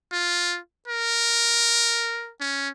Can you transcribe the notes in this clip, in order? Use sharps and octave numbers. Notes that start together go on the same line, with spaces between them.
F4
A#4
C#4